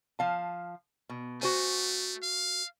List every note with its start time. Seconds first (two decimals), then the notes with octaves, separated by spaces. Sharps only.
0.19 F3 F5 A5
1.09 B2
1.42 A3 F#4 C5 G#5
2.22 F5